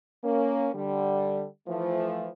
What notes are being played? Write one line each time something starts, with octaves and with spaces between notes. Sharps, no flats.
A#3 C#4
D3 G3
E3 F3 A3